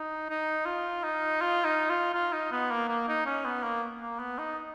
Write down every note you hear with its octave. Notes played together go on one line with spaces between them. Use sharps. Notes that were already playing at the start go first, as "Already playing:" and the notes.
Already playing: D#4
D#4
F4
D#4
F4
D#4
F4
F4
D#4
B3
A#3
A#3
D#4
C#4
B3
A#3
A#3
B3
D#4